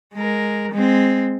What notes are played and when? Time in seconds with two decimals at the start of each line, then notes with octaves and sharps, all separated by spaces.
0.15 G#3 A#4
0.72 G#3 C4